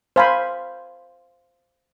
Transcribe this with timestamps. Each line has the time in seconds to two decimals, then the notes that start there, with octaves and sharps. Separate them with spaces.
0.16 C5 F5 G#5 B5